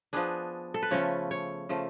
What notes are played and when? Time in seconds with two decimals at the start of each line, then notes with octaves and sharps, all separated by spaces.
0.13 F3 B3 D4 G#4
0.74 A4
0.82 B4
0.91 C#3 F3 A3 C#4 C#5
1.31 C#5
1.69 C#3 F3 A3